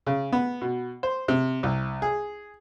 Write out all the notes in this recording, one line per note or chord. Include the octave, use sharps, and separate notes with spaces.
C#3
B3
B2
C5
C3
C2
G#4